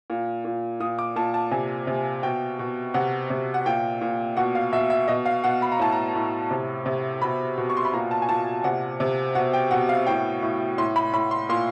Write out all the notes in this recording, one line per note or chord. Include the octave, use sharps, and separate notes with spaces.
A#2
A#2
A#2 D#6
D6
A#2 A5
A5
C3 G#5
C3
B2 G5
B2
C3 F#5
C3
F#5
A#2 G5
A#2
B2 F#5
F5
B2 E5
E5
B2 D#5
F5
B2 F#5
B5
A#5
A2 A5
A#5
A2
C3
C3
B2 B5
B2
C#6
C6
B5
A#2 A#5
A5
G#5
A#2 A5
C3 F#5
C3
B2 F#5
G5
B2 F#5
F5
A2 G5
A2
A2 C6
B5
A2 B5
C6
A#2 C6